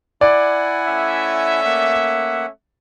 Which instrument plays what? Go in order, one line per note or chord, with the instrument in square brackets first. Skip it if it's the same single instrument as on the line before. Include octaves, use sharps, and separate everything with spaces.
[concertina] E4 F#5 G#5 [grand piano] D5
[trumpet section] A3 C#4 E5
[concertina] A#3 F#5